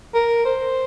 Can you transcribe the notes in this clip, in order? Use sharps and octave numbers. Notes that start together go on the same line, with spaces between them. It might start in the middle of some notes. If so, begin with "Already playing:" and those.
A#4
C5